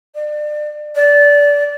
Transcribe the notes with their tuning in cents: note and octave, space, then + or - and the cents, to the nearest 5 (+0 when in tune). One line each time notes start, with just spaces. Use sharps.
D5 +30
D5 -20